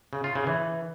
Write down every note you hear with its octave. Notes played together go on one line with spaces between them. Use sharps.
C#3
F4
C#3
E3